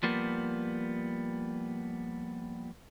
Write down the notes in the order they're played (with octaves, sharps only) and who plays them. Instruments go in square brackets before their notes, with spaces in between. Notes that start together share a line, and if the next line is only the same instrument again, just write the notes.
[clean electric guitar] F3 G3 A#3 B3